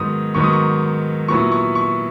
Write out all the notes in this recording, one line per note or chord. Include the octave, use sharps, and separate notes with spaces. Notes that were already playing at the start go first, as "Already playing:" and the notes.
Already playing: G#2 D#3 F#3 B3 D#6
G#2 D#3 F#3 B3 C#6
D#6
C#6
A#2 F#3 B3 E4 C#6
C#6
C#6